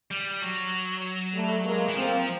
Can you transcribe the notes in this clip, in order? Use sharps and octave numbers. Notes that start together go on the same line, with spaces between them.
G3
F#3
G3 A3
G#3 A#3
E3
F3 A#3 C4